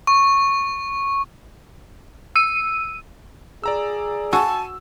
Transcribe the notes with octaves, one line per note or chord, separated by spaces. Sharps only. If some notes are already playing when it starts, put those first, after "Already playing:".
C#6
E6 D#7
G#4 D5 A#5 E6
F#4 G#5 A5 E6